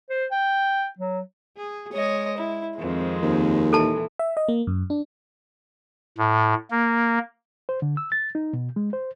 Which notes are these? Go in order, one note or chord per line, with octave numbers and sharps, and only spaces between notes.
C5
G5
F#3
G#4
G#3 C#5 D#5
E4
F2 D#3 G#3 C4
D#2
A#2 E3 A4 A5
E5
D#5
A#3
F#2
D4
A2
A#3
C5
D3
E6
A6
D#4
B2
G#3
C5